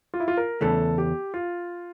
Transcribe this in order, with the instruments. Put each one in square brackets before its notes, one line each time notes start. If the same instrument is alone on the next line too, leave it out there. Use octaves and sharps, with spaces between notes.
[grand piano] F4
E4
F4
A#4
[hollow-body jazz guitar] E2 C#3 E3 A3 [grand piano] A4
[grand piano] G4
F4